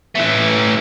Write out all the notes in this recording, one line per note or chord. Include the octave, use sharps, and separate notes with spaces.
E3 A3